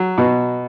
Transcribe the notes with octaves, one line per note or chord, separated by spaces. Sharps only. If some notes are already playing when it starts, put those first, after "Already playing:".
Already playing: F#3
B2